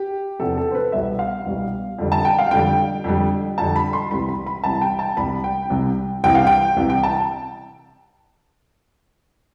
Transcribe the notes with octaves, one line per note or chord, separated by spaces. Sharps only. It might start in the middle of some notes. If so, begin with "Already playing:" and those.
Already playing: G4
E2 C3 F3 A4
A4
C5
B4
C2 B2 G3 E5
F5
C2 B2 G3
F2 D3 G3
A5
G5
F5
F2 D3 G3 G5
F2 D3 G3
F2 D3 G3 A5
B5
C6
C2 C3 E3 G3 B5
B5
B5
C2 C3 E3 G3 A5
G5
A5
C2 C3 G3 B5
G5
C2 C3 G3
C2 C3 E3 G5
F5
G5
C2 C3 E3
G5
A5